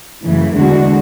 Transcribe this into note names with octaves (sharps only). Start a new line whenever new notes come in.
F#2 C#3 E3 A3
E2 D3 G#3 D4 F#4